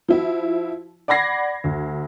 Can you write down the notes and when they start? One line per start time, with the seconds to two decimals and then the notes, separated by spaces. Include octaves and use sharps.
0.08 F3 E4 F#4
1.08 D5 F#5 B5 G#6 A#6 C7
1.64 D2